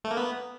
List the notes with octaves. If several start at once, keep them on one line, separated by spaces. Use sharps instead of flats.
A3
A#3
B3